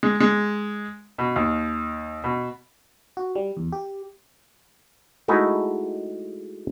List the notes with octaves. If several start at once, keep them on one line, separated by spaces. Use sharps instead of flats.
G#3
G#3
B2
D#2
B2
F#4
G3
E2
G4
G#3 A3 D#4 E4 F#4 G#4